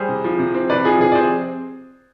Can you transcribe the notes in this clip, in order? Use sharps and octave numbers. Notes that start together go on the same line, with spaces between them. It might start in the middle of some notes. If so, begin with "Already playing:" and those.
Already playing: G3 G#4 C5
C3
F3
C3
C4
C3 B4 D5
F3 G#4
C3 G#4
D5
C4 G#4 C5